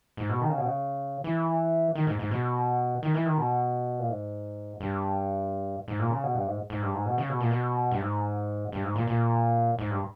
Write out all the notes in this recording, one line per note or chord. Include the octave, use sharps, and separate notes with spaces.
G#2
B2
D#3
C#3
B2
C#3
E3
D#3
G#2
G#2
B2
D#3
E3
D#3
B2
A#2
G#2
G2
G#2
A#2
C#3
B2
G2
G#2
G#2
G2
G#2
B2
C#3
B2
A#2
B2
G2
G#2
G2
G#2
A#2
A#2
G#2
G2